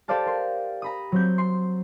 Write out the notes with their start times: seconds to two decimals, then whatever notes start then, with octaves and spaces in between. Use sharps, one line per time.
0.08 G4 A4 C5 D5 F5 A5
0.26 A#4 C6
0.82 A#5 B5 D#6
1.12 F#3 C4 G6
1.38 C6